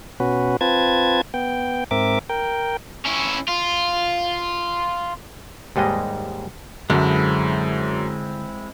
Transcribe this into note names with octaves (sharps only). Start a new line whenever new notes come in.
B2 C#4 F#4 B4
C4 F4 B4 A5 G#6
B3 G5
G#2 C4 A#4 E5 D6
A#4 G5
C#4 E4
F4
D#2 G#2 G3 G#3 D#5
F#2 D3 F#3 G#3 C4 E4